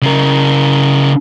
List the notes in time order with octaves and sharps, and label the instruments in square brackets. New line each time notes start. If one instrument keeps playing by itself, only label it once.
[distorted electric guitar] C#3 A#4